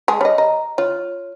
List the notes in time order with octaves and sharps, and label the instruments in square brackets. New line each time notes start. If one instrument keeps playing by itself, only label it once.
[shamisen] G#3 G#4 [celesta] A5
[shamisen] G3 D#5 [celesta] C#5
[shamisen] D#5 [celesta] A#5
[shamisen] F4 [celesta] C#5